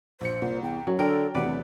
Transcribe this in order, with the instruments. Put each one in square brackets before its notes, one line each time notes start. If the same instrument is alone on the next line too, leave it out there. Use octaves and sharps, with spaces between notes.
[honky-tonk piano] A#1 C#7 [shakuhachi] C5
[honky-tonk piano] C2 [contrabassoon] A#2
[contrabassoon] E2 [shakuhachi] G5
[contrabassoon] F#2 [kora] F#3
[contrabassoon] D3 [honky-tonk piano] D4 G5 D7 [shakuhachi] A4 [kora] A#4
[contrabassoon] D1 [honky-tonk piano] E2 C3 [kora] B4 D5 [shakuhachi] F#5